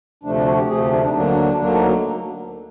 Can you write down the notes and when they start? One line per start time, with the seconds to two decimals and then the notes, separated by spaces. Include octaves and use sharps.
0.23 D2 C3 F3 A3 D4
0.35 D4
0.46 F#4
0.57 G4
0.68 D2 C3 F3 A3 G#4
0.80 G4
0.90 D4
1.02 D4
1.08 D#4
1.13 D2 D3 F#3 A#3 D4
1.57 D2 D3 F#3 A#3 D4
1.72 D#4